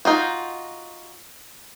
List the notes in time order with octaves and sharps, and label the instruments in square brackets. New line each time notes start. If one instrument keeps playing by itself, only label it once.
[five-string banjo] D#4 F4 F#4